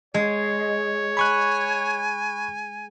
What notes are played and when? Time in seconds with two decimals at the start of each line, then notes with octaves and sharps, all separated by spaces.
0.14 G#3 C#5
1.17 G#5 B5 C#6 F#6